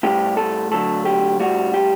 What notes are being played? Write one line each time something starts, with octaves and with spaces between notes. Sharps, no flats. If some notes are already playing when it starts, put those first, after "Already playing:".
A2 G3 G4
A4
D3 F#3 A3 A4
G4
A2 G3 F#4
G4